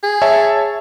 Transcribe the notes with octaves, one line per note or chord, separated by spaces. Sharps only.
G#4
C#5 E5 A5